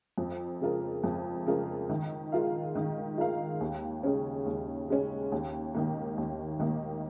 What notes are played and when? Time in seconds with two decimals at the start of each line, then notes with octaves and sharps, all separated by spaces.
0.18 F2
0.61 C#3 G#3 F4 A#4
1.04 F2
1.47 C#3 G#3 F4 A#4
1.89 D#3
2.32 G#3 F4 A#4 F5
2.75 D#3
3.18 G#3 F4 A#4 F5
3.61 D#2
4.03 C#3 G#3 C#4
4.46 D#2
4.89 C#3 G#3 C#4
5.32 D#2
5.75 D#3 A#3
6.18 D#2
6.59 D#3 A#3